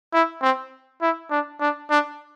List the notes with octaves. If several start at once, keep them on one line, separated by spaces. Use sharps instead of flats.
E4
C4
E4
D4
D4
D4